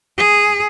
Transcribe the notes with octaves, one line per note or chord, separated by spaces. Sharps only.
G#4